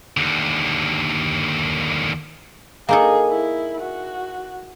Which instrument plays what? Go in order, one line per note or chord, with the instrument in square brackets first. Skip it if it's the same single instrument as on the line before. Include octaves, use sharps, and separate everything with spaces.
[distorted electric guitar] D#2 D3
[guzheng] A#3 D#4 A4 [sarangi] G#4
[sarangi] E4
F#4